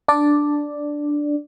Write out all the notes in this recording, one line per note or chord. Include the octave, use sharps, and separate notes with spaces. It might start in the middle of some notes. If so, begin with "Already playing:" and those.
D4 D5